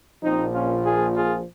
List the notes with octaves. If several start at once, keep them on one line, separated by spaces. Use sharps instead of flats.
A#1 A#2 F3 C4 D#4
C#4 F4
F4 G#4
F4 G#4